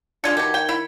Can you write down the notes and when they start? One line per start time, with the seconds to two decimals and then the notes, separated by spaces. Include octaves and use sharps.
0.24 G#3 D4 F4 A4 G#6 C#7
0.37 B2 D#3 G4
0.54 G5
0.69 E4 B5